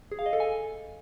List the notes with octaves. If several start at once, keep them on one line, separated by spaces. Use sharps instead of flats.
G#4
F5
D#5
A4
G#5